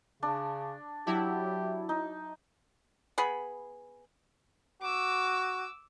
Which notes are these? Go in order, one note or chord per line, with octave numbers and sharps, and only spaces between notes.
C#3 D4
F#3 D4 E4 G4
D#4
B3 G#4 B5
F#4 D6 E6